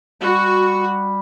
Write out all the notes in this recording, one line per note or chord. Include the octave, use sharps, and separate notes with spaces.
G3 F#4